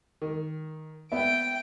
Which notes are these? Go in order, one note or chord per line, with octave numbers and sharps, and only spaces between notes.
D#3
B3 E5 G5 D7